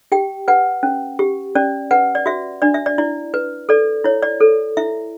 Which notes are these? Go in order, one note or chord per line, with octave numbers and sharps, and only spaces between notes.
G4 G5
B4 F#5
C#4
G4
C#4 D5
B4 F#5
D5
F#4 E5
D4 D5
E5
D5
E4 D5
B4
A4 D5
E4 C#5
D5
A4
E4 E5